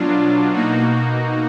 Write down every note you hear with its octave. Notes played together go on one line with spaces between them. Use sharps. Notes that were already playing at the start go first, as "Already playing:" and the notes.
Already playing: B2 F#3 D4 F4
B2 A#3 D#4 F#4